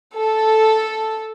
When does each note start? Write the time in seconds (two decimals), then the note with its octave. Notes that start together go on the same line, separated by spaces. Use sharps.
0.17 A4